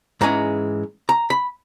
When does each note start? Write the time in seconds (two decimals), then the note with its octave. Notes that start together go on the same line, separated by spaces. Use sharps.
0.21 G#2 E3 G#3 C#4 A#5
1.09 A#5
1.30 B5